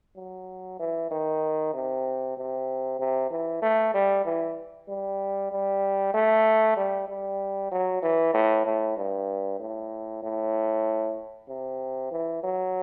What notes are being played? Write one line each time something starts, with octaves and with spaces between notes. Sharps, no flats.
F#3
E3
D#3
C3
C3
C3
E3
A3
G3
E3
G3
G3
A3
G3
G3
F#3
E3
A2
A2
G2
A2
A2
C3
E3
F#3